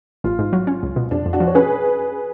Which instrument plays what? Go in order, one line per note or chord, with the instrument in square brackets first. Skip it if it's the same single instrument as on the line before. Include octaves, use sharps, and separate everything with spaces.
[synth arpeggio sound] A1 [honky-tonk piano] F4
[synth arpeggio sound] G#2
F#3
C#4
C#2
B2
[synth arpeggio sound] F2 [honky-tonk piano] D4
[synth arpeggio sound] F2
[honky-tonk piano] D4 F#4
[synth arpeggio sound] F3
[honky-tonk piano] C#5
[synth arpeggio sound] C#4 [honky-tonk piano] G#4 B4